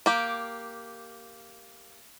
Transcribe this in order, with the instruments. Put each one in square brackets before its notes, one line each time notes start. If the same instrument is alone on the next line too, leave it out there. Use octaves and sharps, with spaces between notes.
[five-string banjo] A#3 G4